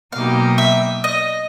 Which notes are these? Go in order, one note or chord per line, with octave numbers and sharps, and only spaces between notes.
B2 F#3 A#3 D#4 G4 F5
E5
D#5